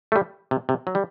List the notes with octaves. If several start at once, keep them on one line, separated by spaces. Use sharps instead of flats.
A3
G3
C3
C3
F#3
G3